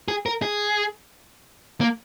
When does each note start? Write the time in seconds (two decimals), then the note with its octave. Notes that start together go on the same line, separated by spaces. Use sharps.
0.08 G#4
0.26 A#4
0.42 G#4
1.81 A#3